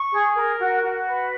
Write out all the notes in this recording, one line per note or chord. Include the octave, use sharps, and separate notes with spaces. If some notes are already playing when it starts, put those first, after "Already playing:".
Already playing: C#6
G#4
A#4
F#4
F#4
B4